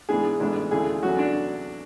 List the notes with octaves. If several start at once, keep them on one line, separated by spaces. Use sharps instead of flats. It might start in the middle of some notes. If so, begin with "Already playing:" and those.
G#2 E3 B3 D4 G#4
A1 G#2 G#3 B3 D4
D2 C#3 E3 A3 G#4
E2 D3 F#3 C#4 F#4
D4